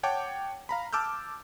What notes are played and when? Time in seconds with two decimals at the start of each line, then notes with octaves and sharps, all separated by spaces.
0.03 C#5 F#5 G5 A5 D6
0.69 F5 A#5 B5
0.93 A5 D6 E6 F6 G6